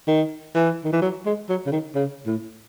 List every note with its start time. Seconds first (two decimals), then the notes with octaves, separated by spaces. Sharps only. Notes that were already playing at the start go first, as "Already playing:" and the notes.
0.08 D#3
0.55 E3
0.84 D#3
0.93 E3
1.02 F#3
1.26 G#3
1.49 F#3
1.66 C#3
1.72 D#3
1.95 C#3
2.26 A2